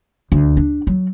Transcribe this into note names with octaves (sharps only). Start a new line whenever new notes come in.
D2
D4
F#3